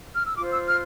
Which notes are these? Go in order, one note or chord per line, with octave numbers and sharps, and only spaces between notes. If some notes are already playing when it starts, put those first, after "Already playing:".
F6
E6
F4 C5 D6
E6
F6